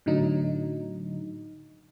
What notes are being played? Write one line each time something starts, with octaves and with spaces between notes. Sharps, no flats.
A2 D3 F#3 D#4